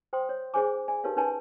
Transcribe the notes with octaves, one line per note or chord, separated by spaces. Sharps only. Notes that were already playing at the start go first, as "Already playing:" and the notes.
C5 G5 C6 D#6
C#5
D4 G#4 C5 C#5 G#5 D6
D5 G#5
D#4 G4 A#4 B4 C#5 F5
C#4 D#4 B4 C#5 G#5 A5